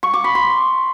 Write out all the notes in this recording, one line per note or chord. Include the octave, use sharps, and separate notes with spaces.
C#6
D6
B5
C6